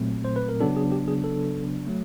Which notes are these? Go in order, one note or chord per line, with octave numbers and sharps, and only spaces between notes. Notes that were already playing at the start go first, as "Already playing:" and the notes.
Already playing: A#2 F#3 A3 C4
C5
B4
A#4
C#3 F#3 B3 D4 A4
G#4
G4
G#4
A4
F#3 A3